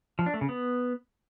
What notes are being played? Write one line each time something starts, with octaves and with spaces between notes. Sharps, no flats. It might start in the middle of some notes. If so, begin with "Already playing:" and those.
F3
D4
A3
C#3
B3